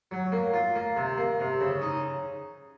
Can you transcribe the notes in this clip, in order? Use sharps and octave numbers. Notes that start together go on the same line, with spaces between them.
F#3
A#3
F4
A#3
C3
A#3
C3
C#3
D#4